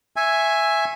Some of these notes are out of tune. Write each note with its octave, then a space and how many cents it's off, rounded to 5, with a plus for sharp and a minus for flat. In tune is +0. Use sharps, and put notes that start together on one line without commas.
E5 +5 G#5 +0 C#6 -30